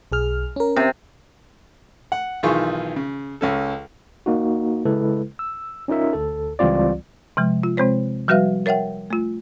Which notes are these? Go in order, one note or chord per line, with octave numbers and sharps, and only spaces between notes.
B1 G#4 F6
C#4 A#4
C3
F#5
B1 D#3 E3 F4 G#4 C#6
C#3
C#2 C#4 A4
A#3 D#4 F#4
C#3 G#3 E4 A4 B4
E6
C#4 D#4 F4 A#4 E5
D2 A4
C#2 E3 G3 C4 F4 D5
C3 F3 G#3
F4
C3 G#3 C4 C5 C#5
F3 G3 F#4 B4 E5 F5
A#4 C#5 E5 F#5 G5
A3 F4